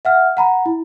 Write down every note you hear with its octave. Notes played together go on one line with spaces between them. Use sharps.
E5 F#5 F6
F#5 A#5 B5
E4